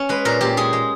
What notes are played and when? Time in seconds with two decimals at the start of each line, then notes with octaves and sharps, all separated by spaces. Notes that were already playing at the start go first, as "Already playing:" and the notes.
Already playing: C#4
0.09 G#3 B4
0.25 A#2 A#4
0.41 A#2 G4
0.57 G#3 G#4
0.73 G#3